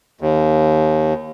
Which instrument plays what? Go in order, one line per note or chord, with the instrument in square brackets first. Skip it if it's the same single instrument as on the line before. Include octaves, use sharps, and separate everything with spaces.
[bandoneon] D#2